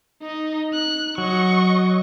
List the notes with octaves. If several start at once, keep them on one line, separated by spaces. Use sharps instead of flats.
D#4 D#5
F#6
F#3 D#5 C#6